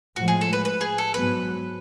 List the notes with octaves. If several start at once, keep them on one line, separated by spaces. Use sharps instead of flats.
A2 F3 G#3 F#4
G#4
A4
B4
B4
G#4
A4
G#2 F#3 B3 B4